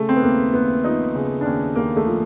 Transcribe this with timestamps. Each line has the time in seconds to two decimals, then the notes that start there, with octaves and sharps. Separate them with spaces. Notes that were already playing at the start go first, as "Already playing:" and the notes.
Already playing: C#3 A3
0.09 C4
0.16 B3
0.23 D#2 A#3
0.53 D#2 B3
0.84 F3 D#4
1.15 C#3
1.41 D4
1.46 D#2 C#4
1.75 D#2 A#3
1.96 A3
2.06 F3